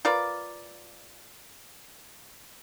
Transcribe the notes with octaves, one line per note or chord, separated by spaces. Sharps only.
F4 A#4 B4 D5